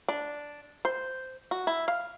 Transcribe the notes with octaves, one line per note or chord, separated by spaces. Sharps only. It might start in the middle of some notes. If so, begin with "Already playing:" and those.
D4
C5
F#4
E4
F5